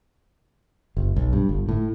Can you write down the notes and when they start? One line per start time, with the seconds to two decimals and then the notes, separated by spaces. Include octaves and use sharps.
0.97 F#1
1.16 B1
1.33 G2
1.49 G1
1.69 A2